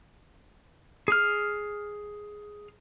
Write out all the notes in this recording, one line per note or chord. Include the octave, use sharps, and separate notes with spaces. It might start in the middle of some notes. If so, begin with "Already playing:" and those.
G#4 F6